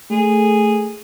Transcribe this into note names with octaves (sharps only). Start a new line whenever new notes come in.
A3 G#4